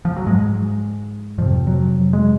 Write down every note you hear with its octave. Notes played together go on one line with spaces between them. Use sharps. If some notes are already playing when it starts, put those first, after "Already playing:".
F3
F#3
G#2 G#3
F2 C3 F3
F#3
G#3